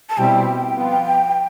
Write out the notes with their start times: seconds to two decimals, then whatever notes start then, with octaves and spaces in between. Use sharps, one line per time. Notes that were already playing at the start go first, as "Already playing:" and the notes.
0.10 A5
0.18 B2 G3 C4 E4 G5
0.73 F3 B3 F4